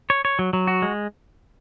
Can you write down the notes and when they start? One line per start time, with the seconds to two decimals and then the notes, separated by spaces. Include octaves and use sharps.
0.10 C#5
0.25 C#5
0.39 F#3
0.53 F#3
0.67 F#4
0.82 G#3